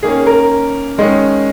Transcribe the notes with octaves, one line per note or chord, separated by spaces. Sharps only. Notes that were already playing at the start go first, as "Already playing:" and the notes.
D#3 A#3 C#4 G#4
A#4
D#3 G#3 C#4